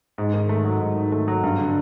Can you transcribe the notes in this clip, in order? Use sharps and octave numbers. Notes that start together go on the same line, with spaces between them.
G#2
D#3
A3
F#3
G#2
D#3
A3
F#3
G2
D3